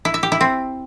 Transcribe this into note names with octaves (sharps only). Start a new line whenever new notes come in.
E4
E5
G4
E4
C4